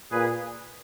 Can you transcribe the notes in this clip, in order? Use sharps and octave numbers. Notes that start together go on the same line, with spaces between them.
A#2 G#4 B4